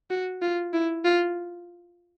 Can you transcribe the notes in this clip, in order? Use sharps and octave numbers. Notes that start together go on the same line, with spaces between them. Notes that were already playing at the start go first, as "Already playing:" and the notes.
F#4
F4
E4
F4